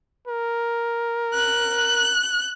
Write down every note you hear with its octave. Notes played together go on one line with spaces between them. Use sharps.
A#4
F#6